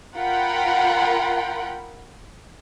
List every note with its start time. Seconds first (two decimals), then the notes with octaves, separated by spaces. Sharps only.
0.16 F4 A#4 F#5 G5 B5